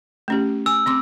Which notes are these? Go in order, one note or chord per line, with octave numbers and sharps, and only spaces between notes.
A3 C#4 G4
G#5 E6
C4 C6 D6